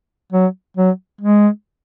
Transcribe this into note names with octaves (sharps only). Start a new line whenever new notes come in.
F#3
F#3
G#3